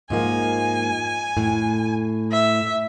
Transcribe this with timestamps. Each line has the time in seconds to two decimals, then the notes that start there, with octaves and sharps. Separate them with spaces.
0.10 G#2 F3 A#3 G#5
1.37 A2
2.31 E5